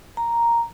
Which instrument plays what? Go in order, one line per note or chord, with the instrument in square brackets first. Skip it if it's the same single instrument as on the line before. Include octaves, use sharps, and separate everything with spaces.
[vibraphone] A#5